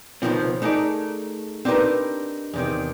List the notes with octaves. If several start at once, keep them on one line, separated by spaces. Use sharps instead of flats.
C#2 B2 D#3 F3 C4
A3 D#4 G#4 A#4 D5
C4 D4 D#4 G4 A#4 B4
E2 C3 D#3